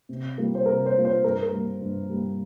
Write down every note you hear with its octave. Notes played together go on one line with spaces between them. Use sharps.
C3
G3 A#3 F4
C5
C3 A#4
C5
G3 A#3 F4
C5
G2 A#4
A#4
G3 A#3
G2
G3 A#3